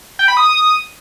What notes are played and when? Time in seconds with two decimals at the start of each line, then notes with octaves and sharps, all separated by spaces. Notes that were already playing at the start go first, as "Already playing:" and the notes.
0.19 G5
0.28 B5
0.37 D#6